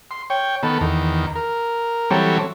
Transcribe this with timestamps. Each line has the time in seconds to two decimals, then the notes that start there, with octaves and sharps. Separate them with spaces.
0.11 C6
0.30 C#5 G5
0.63 D#3 B3 A4
0.81 E2 D#3
1.35 A#4
2.10 E3 F#3 G3 C4 A4 C#5